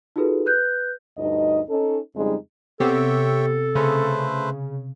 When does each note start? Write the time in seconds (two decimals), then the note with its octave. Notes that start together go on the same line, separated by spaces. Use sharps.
0.16 D#4 F4 F#4 G#4 A4 B4
0.46 B4 F#6 G6
1.18 D2 G2 D#4 D#5
1.69 C#4 D#4 A4
2.16 F2 C#3 G3 G#3 D#4
2.80 C3 B3 C4 G4 A4 C#5 E5 G5
3.75 C#3 A3 B4 C5